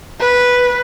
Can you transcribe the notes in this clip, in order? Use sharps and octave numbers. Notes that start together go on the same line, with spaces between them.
B4